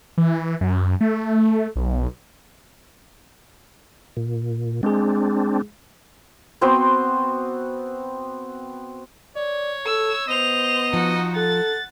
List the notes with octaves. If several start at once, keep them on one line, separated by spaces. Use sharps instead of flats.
E3
F#2
A3
B1
A#2
G#3 C4 D4 G#4
B3 C4 F#4 C5
C#5 D5
A4 E6
B3 C5 D#5 F7
F3 D#4 F#4
A4 F#5 A6